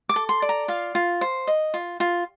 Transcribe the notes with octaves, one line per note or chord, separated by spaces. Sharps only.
D6
A4
C6
D5
A#5
F4 F5
F4
C5
D#5
F4
F4